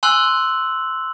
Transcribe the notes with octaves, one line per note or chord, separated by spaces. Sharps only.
G#5 C6 E6 F#6 F#7